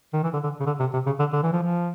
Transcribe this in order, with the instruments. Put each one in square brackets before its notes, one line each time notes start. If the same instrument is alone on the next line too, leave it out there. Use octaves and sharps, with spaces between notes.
[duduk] D#3
E3
D3
D3
C#3
D3
C3
C3
C#3
D3
D3
E3
F3
F3